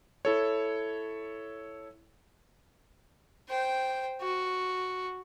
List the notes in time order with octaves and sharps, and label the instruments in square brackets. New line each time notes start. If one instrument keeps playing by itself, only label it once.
[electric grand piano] E4 A4 C#5
[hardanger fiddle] C5 G5
F#4